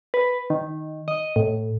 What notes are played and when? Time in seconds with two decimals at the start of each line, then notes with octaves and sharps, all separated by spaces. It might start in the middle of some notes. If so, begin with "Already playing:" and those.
0.14 B4
0.50 D#3
1.08 D#5
1.36 A2